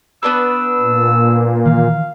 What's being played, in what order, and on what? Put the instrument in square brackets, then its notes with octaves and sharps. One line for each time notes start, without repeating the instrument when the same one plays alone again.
[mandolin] B3 D4 B4 [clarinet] E6
[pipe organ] A#2
[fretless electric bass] D#3 E3 [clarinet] F5